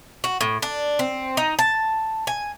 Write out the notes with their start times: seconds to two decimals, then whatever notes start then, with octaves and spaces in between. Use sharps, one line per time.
0.24 F#4
0.41 A2
0.62 D4
0.99 C4
1.37 D#4
1.59 A5
2.27 G#5